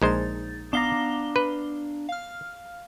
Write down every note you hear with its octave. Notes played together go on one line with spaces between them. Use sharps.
A#1 G#3 D#4 C5 A6
B3 D4 F5 A#5 D6 G7
B4
F5 F6